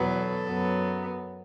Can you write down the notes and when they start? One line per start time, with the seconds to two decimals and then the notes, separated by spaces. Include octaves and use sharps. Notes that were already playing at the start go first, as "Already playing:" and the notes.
Already playing: E2 B2 F#3 B3
0.11 A4
0.48 F#2 F#3 B3